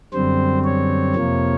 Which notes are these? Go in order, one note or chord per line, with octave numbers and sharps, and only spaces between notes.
F#2 D3 G3 C4 C5
C#5
F2 C3 F3 A#3